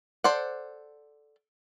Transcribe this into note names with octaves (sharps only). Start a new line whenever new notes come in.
A4 C5 D5 F#5